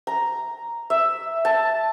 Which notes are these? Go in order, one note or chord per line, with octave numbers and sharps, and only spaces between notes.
A#5
E5
A5